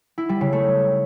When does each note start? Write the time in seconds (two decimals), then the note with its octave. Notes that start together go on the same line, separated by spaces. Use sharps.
0.18 E4
0.29 G3
0.41 C#3
0.52 A3